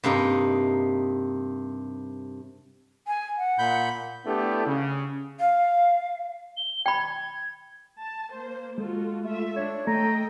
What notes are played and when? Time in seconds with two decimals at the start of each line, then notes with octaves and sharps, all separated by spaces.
0.04 G2 C3 A#3 D#4
3.07 G#5
3.38 F#5
3.59 A#2 B5 G6
4.25 A3 B3 D4 E4 G4
4.66 C#3
5.40 F5
6.57 G7
6.86 G5 B5 G#6
7.99 A5
8.31 A#3 C5
8.78 G#3 F4 F#4 A4
9.23 A3 F4 A4 E5
9.56 D4 C#5
9.87 A3 A4 D#5 G5 A#5